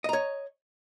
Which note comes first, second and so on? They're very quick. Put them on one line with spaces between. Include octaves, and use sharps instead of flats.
D#5 A#5 C#5